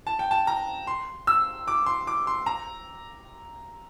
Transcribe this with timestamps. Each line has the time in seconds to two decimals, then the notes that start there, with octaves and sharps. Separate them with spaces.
0.07 A5
0.19 G5
0.31 A5
0.47 A#5
0.87 C6
1.27 E6
1.68 D6
1.86 C6
2.07 D6
2.27 C6
2.46 A#5